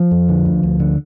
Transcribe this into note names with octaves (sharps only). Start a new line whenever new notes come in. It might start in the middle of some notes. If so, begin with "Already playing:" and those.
Already playing: F3
F2
D3
D2
D2
D3